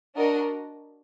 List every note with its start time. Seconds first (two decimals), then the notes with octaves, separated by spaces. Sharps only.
0.15 D4 F#4 A#4 D#5